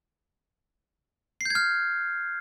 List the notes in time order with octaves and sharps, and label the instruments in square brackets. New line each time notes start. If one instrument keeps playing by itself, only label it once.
[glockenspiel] C7
G6
G#6
F6